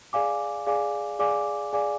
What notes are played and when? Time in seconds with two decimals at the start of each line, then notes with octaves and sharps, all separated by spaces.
0.13 G#4 D5 F5 G#5 D6
0.67 G#4 D5 F5 G#5 D6
1.19 G#4 D5 F5 G#5 D6
1.73 G#4 D5 F5 G#5 D6